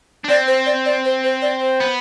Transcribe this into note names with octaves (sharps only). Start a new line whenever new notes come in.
D4
C4 D5
C5
D5
D5
C5
C5
D5
C5
B3